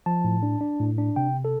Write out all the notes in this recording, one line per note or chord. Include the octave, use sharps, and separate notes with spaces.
F3 A5
A2
D4
D4
A2
D4
C3 G5
A4